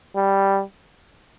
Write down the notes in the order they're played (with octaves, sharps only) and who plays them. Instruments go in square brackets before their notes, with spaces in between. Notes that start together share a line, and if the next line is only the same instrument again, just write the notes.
[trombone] G3